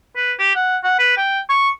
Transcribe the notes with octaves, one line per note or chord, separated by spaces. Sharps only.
B4
G4
F#5
F#5
B4
G5
C#6